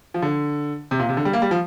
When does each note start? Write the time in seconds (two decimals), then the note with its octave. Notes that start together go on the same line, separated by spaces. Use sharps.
0.14 F3
0.22 D3
0.91 C3
0.99 A#2
1.09 C3
1.17 D3
1.25 G3
1.33 A#3
1.42 G3
1.51 F3